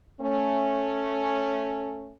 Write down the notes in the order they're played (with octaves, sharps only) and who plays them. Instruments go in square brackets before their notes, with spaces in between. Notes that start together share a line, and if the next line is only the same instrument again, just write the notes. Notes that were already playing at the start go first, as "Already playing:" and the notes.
[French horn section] A3 C#4